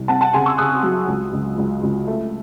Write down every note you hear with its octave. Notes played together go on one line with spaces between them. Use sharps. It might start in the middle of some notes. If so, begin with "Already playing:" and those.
Already playing: C2
C4 F#5 A5
F#5 A5
C#3 G#5 C6
C#6 E6
C#3 D#6 F#6
F#3
C#2
C#2
C#2
C#2
A3